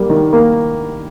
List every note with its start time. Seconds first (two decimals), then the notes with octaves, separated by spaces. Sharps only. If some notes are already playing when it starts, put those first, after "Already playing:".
Already playing: G3 A#3
0.10 D#3
0.33 A#3